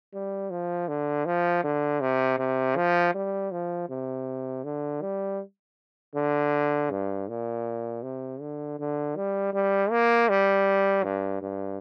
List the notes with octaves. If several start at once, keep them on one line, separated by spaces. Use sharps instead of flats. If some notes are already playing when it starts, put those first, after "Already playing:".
G3
F3
D3
F3
D3
C3
C3
F3
G3
F3
C3
D3
G3
D3
G2
A#2
C3
D3
D3
G3
G3
A#3
G3
G2
G2